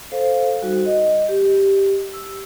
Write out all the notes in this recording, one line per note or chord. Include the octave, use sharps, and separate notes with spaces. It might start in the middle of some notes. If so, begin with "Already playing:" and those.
A4 C5 F5
G3 D#4 F#4
D#5
G4
E6